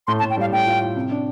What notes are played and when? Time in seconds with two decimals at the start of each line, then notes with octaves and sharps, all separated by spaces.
0.07 A2 C6
0.19 A5
0.23 A2
0.30 G5
0.37 G3 F5
0.52 A2 G5
0.67 F4
0.82 F4
0.96 C3
1.11 D4